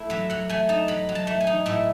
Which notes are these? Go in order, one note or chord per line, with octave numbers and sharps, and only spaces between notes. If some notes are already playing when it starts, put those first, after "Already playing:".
Already playing: A3 E4
F#3 E5
F#3 F#5
A3 G#5
D#4 A5
F#3 B5
F#3
A5
A3
G#5
D#4
A2 E5